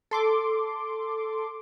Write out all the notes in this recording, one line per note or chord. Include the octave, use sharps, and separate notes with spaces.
A4 C6 D6